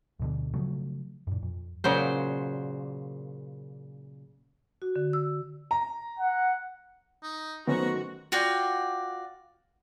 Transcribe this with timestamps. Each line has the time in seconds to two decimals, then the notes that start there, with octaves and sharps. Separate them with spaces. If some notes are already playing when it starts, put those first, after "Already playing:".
0.19 D2 B2 D3
0.54 C#3 F3 F#3 A3
1.27 F#2 A#2
1.43 F2
1.84 A#2 C#3 F#3 C5
4.82 F#4
4.96 D3
5.13 E6
5.71 A#5
6.20 F#5
7.23 D#4
7.67 D#3 F#3 A3 B3 C#4 F#4 C5 A#5
8.32 F4 F#4 D5 G5